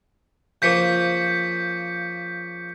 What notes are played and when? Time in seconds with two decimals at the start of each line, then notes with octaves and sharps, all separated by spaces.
0.62 C#3 F3 A#3 G6 B6 C#7